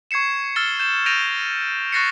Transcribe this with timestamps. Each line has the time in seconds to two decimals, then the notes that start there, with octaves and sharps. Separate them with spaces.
0.11 C#6 G#6 C7 C#7 E7
0.56 E6 F6 A6 C#7 E7 G7
0.79 G6 E7
1.06 G6 A6 A#6 D7 D#7 F7
1.92 C#6 F#6 A6 A#6 C7 C#7